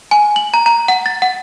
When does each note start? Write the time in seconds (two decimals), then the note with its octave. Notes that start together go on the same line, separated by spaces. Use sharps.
0.11 G#5
0.36 F#7
0.54 A#5
0.66 A#5
0.88 F#5
1.06 A6
1.22 F#5